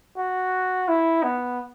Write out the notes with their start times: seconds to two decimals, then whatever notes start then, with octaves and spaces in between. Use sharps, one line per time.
0.17 F#4
0.88 E4
1.23 B3